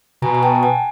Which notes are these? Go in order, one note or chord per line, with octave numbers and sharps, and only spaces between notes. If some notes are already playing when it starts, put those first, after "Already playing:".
B2 G#5 A#5
G#5
G5 A5
F#5 G#5